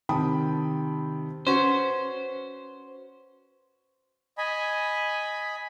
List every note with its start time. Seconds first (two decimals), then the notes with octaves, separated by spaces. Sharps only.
0.09 C3 D#3 G5 A5 B5 D#6
1.47 C#4 F#4 B4 C5
4.38 D#5 G#5 B5